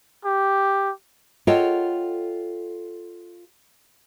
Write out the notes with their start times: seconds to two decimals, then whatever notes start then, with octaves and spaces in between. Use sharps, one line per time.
0.25 G4
1.47 F4 A4 C#5 D#5 F#5 G5